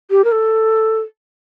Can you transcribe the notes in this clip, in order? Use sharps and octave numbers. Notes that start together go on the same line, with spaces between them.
G4
A#4
A4